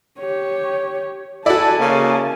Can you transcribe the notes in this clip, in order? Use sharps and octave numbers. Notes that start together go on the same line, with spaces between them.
G4 C#5
E4 F#4 A4 D5 G#5 A5
C#3 A#3